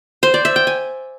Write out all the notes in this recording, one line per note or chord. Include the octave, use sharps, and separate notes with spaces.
C5
D5
E5
G5
G#5